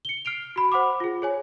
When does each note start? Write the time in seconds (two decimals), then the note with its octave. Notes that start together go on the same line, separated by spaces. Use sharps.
0.05 C#7 G7
0.25 F6 C7 D7 F7
0.56 F#4 B5
0.72 C5 F#5 B5 D6
1.00 F4 G#4
1.22 G#4 C#5 G#5